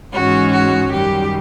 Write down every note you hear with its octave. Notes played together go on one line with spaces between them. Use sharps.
G#2 E3 G#3 C#4 F#4
F#4
F#2 D#3 G3 G4